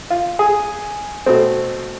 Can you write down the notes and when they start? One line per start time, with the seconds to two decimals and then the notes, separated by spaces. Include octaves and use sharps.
0.10 F4
0.39 G#4
1.26 B2 A3 C4